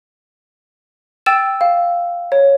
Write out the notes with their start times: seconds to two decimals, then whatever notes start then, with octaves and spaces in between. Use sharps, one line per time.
1.26 G5 E6 A6 E7
1.61 F5
2.32 C#5